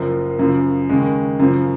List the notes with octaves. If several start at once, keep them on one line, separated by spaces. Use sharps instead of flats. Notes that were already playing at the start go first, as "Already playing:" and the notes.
Already playing: F#1 F#2 F3
F#2 C#3 F3
D#2 C#3 G#3
F#2 C#3 F3